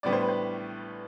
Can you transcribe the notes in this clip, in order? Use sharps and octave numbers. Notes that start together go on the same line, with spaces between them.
A1 A2 G3 B3 D4 D5
C5
B4
C5